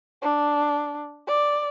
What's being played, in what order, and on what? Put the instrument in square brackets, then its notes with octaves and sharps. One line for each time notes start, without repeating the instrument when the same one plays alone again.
[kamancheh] D4
D5